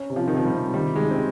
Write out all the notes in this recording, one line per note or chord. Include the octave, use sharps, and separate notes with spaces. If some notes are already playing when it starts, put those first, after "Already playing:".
Already playing: C#4
C3
F3
C3 D#3
F3
G3
C3
D#3 G3
D#3 G#3
C4